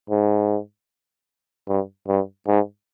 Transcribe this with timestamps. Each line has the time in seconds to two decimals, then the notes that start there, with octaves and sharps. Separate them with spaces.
0.10 G#2
1.68 G2
2.08 G2
2.47 G#2